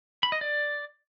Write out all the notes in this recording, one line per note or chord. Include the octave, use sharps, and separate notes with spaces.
B5
D#5
D5